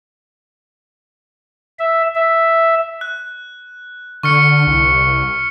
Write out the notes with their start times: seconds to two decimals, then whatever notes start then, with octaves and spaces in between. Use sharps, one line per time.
1.79 E5
2.15 E5
3.01 F#6
4.23 D3 C#6 F6 C#7
4.67 C2